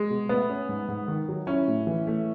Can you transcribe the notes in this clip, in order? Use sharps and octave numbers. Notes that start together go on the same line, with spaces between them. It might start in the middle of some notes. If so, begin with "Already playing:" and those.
Already playing: G#3
B2
A3 B3
C#4
G#2
G#2
D#3
F#3
C#4 E4
A2
E3
A3